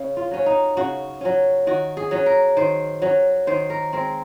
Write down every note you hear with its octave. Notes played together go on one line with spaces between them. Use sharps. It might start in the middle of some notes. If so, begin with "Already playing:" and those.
Already playing: C#3
F4
F#3 C#4
D#4
C#3 F#4
F#3 C#4
D#3 F#4
G#4
F#3 C#4
A#4
D#3 C5
F#3 C#4
D#3 C5
A#4
G#3 C4 A#4